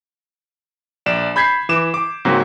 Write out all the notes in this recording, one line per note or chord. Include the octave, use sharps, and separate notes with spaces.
A#1 D5 E7
B5 G6 G#6 B6 C7
E3 D6 E7
D6
G#2 C#3 F#3 A#3 C4